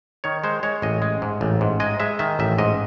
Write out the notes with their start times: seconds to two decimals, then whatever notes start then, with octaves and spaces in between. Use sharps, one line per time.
0.24 D#3 C#5
0.44 G#3 C5
0.63 G#3 C#5
0.82 A1 D#5
1.02 G#3
1.22 G#2
1.41 A1
1.61 G#2
1.80 G#3 D#5
2.00 G#3 E5
2.19 D#3 E5
2.39 A1 E5
2.58 G#2 D#5